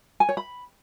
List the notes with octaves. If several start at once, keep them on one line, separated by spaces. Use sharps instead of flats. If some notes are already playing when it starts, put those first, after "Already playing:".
G#5
C#5
B5